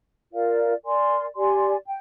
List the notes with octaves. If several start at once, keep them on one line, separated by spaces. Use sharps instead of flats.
F4 A#4 D5 F5
A#4 D5 G#5 C6
G4 D5 G#5 C6
G5